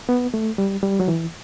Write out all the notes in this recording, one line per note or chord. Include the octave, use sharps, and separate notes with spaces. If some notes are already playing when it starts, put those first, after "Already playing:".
B3
A3
G3
G3
F#3
E3